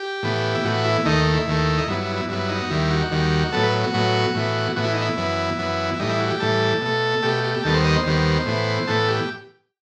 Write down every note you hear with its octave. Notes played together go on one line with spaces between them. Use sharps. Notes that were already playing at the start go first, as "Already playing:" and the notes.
Already playing: G4
A2 E3 B3
E4
A2 E3 B3 F#4
E4
D#2 D#3 A3 D#4
E4
D#2 D#3 A3
D#4
G2 F#3 B3 E4
E4
E4
G2 F#3 B3 E4
D#4
F#4
D#2 D#3 G3 E4
F#4
D#2 D#3 G3
A2 F#3 B3 A4
B4
F#4
A2 F#3 B3
A2 E3 B3
A2 E3 B3 F#4
E4
D#4
E4
F#2 E3 B3
F#2 E3 B3
E4
A2 E3 G3 D#4
E4
F#4
G4
A2 E3 G3 A4
B2 A3
B2 A3 G4
G4
G4
D#2 D#3 G3 B3 A4
C5
D#5
C5
D#2 D#3 G3 B3
A2 E3 B3
A2 E3 B3 A4
G4